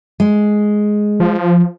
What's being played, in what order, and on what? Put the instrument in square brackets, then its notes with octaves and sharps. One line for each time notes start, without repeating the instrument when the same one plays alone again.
[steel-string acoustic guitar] G#3
[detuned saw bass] F3